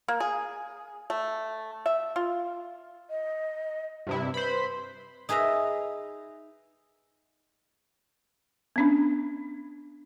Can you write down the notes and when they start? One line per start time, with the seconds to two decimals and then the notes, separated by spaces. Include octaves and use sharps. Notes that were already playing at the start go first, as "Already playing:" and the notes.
0.08 A#3
0.20 G#4
1.10 A3
1.86 E5
2.16 F4
3.10 D#5
4.07 G2 C3 E4
4.34 B4 C5 B5
5.29 D#4 G#4 B4 E5 A#5
8.76 B3 C#4 D4